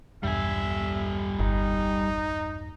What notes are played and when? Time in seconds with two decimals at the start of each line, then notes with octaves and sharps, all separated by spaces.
0.23 B1 E2 G2 G3 E5 G#5
1.39 G1 D#4